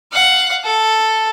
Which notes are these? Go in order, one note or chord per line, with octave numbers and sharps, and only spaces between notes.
F5 F#5
A4